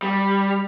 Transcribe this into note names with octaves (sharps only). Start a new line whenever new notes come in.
G3